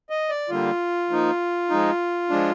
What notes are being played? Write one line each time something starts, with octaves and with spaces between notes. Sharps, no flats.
D#5
D5
D3 G3 A#3 F4
F3 A#3 D#4
F3 G#3 D#4
F3 G#3 D4